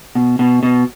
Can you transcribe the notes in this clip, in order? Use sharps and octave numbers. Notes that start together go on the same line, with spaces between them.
B2
B2
B2